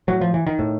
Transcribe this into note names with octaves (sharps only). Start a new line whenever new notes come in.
A2 F#3
F3
E3
D#3
A2